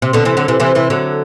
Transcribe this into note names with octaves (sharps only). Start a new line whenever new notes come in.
C3
B2 D3
C3 E3
D3 F#3
C3 E3
C3 E3
C3 E3
D3 F#3